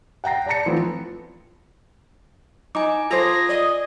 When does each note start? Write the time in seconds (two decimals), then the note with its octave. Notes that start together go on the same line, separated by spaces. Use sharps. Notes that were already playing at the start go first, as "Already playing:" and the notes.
0.24 F#5 G5 A#5 A#6 C7
0.46 D5 A5 A#5 A#6 C#7
0.66 E3 F3 A3 B3 C4
2.75 D#4 G#5 A#5 D6
3.11 F4 G#4 A4 C5 A#6
3.49 D5 D#5